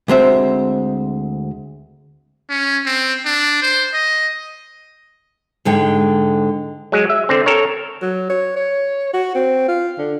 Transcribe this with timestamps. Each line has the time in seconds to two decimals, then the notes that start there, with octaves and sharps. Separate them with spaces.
0.08 D2 G#3 C4 E5
2.50 C#4
2.86 C4
3.26 D4
3.62 C5
3.94 D#5
5.65 G#2 D3 G#3 G5
6.92 F#3 G#3
7.10 E5
7.29 D3 C4
7.46 A4 A#4 C#5
8.02 F#3
8.29 C#5
8.56 C#5
9.14 F#4
9.35 C4
9.68 F4
9.98 D3